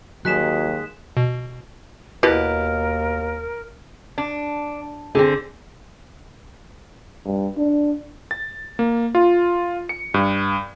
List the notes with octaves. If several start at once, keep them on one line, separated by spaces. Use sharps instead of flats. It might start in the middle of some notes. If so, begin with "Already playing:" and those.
D#2 F#3 G#3 G#4 D#5 F#6 B6 E7
B2
D#2 B2 E4 G4 A#4 B4
D4
D3 C4 G#4
G2
D4
A6
A#3
F4
C#7
G2